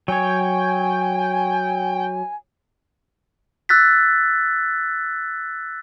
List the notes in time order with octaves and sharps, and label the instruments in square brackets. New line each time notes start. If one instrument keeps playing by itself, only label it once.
[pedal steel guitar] F#3 C#5 [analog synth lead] G5 [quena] G#5
[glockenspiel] E6 F#6 A6 B6